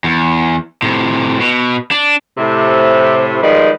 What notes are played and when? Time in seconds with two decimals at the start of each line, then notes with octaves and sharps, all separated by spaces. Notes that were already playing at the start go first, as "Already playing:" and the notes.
0.04 E2
0.82 A2 C3
1.40 B2
1.91 D4
2.38 A2 C3
3.43 D#3 F3 G3 G#3 B4